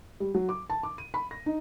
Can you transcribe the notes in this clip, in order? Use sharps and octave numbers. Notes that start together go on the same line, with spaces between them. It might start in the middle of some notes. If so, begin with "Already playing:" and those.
G3
F#3
D6
A5
D6
D#7
B5
A#6
D#4